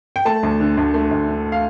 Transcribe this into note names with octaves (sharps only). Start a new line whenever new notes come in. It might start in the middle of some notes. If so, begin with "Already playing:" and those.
G5
A3 A5
D2
D3
D2
A3
D2
D3
F5